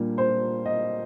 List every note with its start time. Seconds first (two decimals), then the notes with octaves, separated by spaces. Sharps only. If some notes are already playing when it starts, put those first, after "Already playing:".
Already playing: A#2 G3 A#3 D4
0.18 C5
0.66 D#5